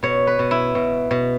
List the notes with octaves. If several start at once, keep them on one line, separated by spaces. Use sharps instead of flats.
B2 C#5
B4
B2
E4
B2
B2